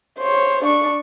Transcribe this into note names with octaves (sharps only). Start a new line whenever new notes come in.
C5 C#5
D4 C#6